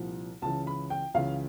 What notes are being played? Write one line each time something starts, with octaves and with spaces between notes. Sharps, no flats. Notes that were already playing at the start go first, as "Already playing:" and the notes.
Already playing: C2 A#2 F3
C#2 C#3 E3 A5
B5
G5
C#2 C#3 E3 F5